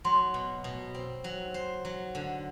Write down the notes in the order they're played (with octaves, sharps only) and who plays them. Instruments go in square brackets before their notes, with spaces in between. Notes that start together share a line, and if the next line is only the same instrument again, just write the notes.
[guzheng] F#3 [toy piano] C6
[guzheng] B2
B2
C4
F#3
C5
F#3
D3